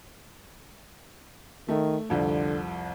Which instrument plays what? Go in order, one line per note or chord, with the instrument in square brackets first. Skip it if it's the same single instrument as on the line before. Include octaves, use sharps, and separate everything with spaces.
[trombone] D#3 [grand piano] A3
[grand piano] C2 F2 [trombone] D3